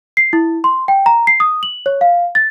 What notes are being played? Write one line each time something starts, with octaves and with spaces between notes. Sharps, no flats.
C7
E4
C6
G5
A#5
C7
D#6
F#7
C#5
F5
A6